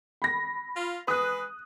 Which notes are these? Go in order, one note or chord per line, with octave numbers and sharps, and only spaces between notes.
B5 A#6
F4
G#3 B4 D#6 F#6